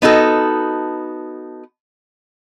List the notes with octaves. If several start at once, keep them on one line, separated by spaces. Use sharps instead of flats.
B3 D#4 F#4 A4